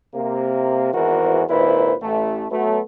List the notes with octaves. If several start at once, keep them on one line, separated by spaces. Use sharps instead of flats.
C3 A#3
G#1 E2 E3 F#4 A#4 C5
G#1 A#2 D#3 E4 B4 C5
A1 A3
F#3 A3 B3